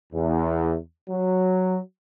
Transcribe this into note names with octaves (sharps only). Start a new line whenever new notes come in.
E2
F#3